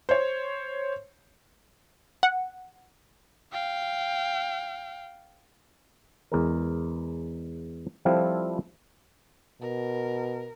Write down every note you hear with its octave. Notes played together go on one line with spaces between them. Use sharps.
C5 C#5
F#5
F5 G5
E2 G#3 A#4
F3 G3 C4 E4 F4 A4
B2 A#4